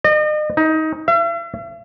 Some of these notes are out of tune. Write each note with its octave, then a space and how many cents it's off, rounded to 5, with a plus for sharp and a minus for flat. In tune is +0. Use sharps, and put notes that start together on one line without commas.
D#5 -40
D#4 +20
E5 +45